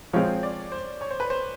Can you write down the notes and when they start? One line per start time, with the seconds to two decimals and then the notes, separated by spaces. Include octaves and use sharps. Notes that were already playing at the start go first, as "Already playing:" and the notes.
0.13 F3 G#3 C4 F4 C#5
0.43 D5
0.72 C5
1.01 C#5
1.11 C5
1.20 B4
1.30 C5